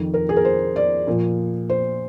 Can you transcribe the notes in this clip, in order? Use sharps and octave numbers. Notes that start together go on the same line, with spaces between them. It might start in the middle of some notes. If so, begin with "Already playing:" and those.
Already playing: F2 D#3
A#4
G#4
A#4
C5
D5
A#2 F3
C5